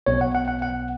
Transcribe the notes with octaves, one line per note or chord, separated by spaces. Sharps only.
B1 B2 B3 C#5
F#5
F#5
F#5
F#5